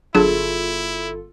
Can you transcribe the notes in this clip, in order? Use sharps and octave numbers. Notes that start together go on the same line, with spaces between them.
G1 F#3 D4 E4 F4 G#4 A4 G#6